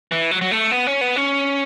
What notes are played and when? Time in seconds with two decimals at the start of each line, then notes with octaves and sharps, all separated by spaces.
0.12 E3
0.31 F#3
0.41 F#3
0.51 A3
0.71 B3
0.87 C#4
1.01 B3
1.16 C#4